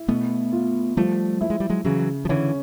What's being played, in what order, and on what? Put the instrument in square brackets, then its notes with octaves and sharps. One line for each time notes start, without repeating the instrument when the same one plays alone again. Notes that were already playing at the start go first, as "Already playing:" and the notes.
Already playing: [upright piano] E4
[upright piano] B2 [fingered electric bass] A3 B3
[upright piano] F4
[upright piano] F3 [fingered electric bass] G3 A3
[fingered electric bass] A3 [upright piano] E4
[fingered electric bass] G#3
G3
F#3 G#3
[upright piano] C#3 [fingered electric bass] E3 F#3
[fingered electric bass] F3
[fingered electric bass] D3 E3 [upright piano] C#4